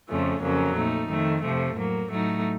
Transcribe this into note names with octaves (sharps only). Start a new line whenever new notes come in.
F2 C#3 F3 A3 C#4
F2 C#3 F#3 A#3 C#4
A#2 A3 D#4
F2 D#3 A3
F2 C3 F3 A3
A2 F#3 A#3
A2 F#3 A3 D#4